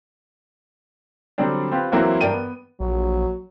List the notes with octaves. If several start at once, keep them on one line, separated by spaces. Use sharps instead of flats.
D3 F#3 G3 C4 D4
C4 F4 G4 B4
E3 F#3 A#3 C4 E4 F#4
G2 D4 A#4 D5 G5 D#7
B3
A#1 F#3